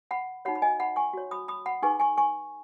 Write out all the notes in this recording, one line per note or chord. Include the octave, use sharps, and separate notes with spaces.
F#5 B5
D#4 F#4 C#5 F#5 B5
B5
D#5 G#5
F#5 B5
G#5 C#6
F#4 C#5
B5 D#6
B5 D#6
F#5 B5
D#4 G#4 B4 G#5 C#6
G#5 C#6
G#5 C#6